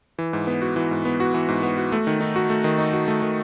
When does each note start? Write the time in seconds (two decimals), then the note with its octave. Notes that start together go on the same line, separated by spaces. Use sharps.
0.19 E3
0.33 G#2
0.47 B3
0.62 F#4
0.76 E3
0.91 G#2
1.05 B3
1.20 F#4
1.34 E3
1.48 G#2
1.63 B3
1.78 F#4
1.92 A3
2.07 D#3
2.21 D#4
2.36 F#4
2.50 A3
2.64 D#3
2.79 D#4
2.93 F#4
3.08 A3
3.22 D#3